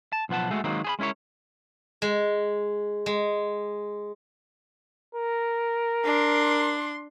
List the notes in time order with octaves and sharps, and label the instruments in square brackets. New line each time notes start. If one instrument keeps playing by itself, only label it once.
[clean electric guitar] A5
B1 F3 B3 F#5 A5
G#3 A3 F#4
D#3 F#3 G#3 A#3 C4
G#4 C5 B5
G#3 C#4 E4 A#4 C#5
[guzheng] G#3
G#3
[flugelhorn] A#4
[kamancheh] D4 C6